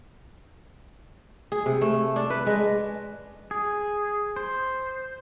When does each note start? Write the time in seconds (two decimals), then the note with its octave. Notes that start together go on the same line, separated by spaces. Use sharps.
1.52 G#4
1.66 C3
1.81 A3
2.16 D4
2.30 B4
2.46 G#3
3.51 G#4
4.36 C5